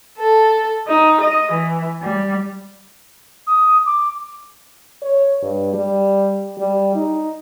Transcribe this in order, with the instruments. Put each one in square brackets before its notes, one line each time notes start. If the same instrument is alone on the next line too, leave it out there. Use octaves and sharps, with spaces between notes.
[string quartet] A4
D#4
D#5
E3
G3
[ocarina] D#6
D6
[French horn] C#5
G2
G3
G3
D#4